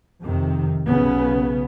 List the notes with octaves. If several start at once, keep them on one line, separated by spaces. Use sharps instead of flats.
F2 C3 D#3
B1 C#3 B3